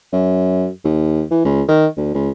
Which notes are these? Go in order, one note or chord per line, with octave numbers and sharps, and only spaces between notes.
F#2
D#2
E3
C#2
D#3
D2
C#2